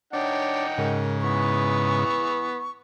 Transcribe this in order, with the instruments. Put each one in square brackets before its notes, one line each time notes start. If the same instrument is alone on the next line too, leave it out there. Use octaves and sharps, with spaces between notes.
[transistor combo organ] D4 [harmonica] D#4 F#5 G5 [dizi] C#5
[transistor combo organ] G#2 C#3 [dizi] A#4
[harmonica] E3 B3 [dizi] C#6